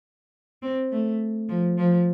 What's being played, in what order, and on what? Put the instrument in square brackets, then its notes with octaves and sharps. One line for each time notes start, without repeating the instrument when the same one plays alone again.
[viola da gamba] C4
A3
F3
F3